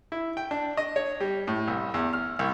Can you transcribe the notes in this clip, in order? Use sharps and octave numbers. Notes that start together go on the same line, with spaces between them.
E4
G5
D4
D#5
C#5
G3
A2
C2
E2
F6
C2